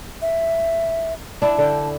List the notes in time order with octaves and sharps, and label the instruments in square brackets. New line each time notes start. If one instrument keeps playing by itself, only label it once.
[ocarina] E5
[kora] D4 E4 [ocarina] A5
[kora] D3 G5